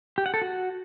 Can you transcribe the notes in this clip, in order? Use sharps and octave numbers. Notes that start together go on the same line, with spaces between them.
G4
F#5
A4
F#4